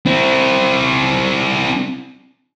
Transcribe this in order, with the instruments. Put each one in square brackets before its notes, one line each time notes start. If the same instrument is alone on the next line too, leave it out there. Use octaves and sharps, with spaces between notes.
[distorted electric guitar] C4 E4